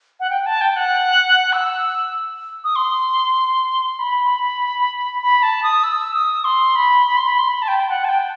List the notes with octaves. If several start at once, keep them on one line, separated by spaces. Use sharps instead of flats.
F#5
G5
A5
G5
F#5
E6
D#6
C6
B5
B5
A5
D#6
E6
D#6
C6
B5
B5
C6
B5
C6
B5
A5
G5
F#5
A5
G5